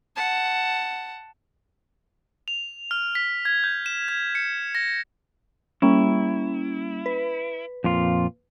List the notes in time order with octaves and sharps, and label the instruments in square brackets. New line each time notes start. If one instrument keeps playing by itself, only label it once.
[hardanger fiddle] F#5 A5
[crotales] F7
F6
B6
G#6
G6
E7
G#6
C#7
A#6
[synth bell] G3 A#3 C#4 [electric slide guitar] E4
[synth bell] B4
[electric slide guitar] F2 A#2 F4